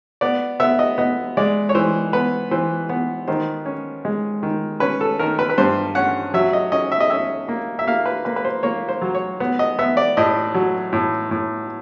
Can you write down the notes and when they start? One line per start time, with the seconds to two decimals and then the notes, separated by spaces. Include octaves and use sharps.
0.21 B3 D5
0.60 B3 E5
0.79 D#5
0.98 B3 D#5
1.37 G#3 D5
1.69 C#5
1.75 E3 C5
2.13 B3 B4
2.51 E3 C5
2.90 B3
3.28 D#3 C5
3.66 C#4
4.05 G#3
4.43 D#3
4.80 C#4 B4
5.01 A4
5.19 D#3 A#4
5.39 B4
5.50 B4
5.58 G2 C5
5.95 C#4 F#5
6.34 F#3 E5
6.53 D#5
6.72 C#4 D#5
6.92 E5
7.00 D#5
7.10 C#4 E5
7.48 A#3
7.79 E5
7.87 A#3 F5
8.06 B4
8.25 A#3 B4
8.36 B4
8.45 C5
8.63 A#3 C#5
8.89 C5
9.02 F#3
9.15 C#5
9.40 B3
9.59 D#5
9.79 B3 E5
9.97 D5
10.17 A2 D#5
10.54 F#3
10.93 A2
11.31 A2